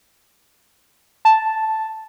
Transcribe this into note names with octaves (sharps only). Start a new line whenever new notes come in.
A5